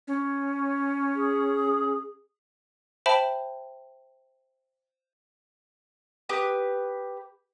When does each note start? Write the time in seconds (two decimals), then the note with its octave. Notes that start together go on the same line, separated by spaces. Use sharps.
0.08 C#4
1.16 G#4
3.06 C5 E5 G5 A5 B5
6.29 G4 B4 D#6